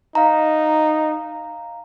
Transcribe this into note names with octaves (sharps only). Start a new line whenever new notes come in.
D#4 F5 A#5